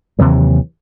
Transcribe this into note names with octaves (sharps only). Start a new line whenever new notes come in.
D#2 C3 E3 F#3